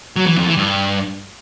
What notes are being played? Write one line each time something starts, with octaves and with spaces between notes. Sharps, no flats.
F#3
E3
F2
E3
G2